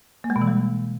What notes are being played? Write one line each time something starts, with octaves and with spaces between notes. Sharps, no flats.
A#3
G#3
B2
E3
G3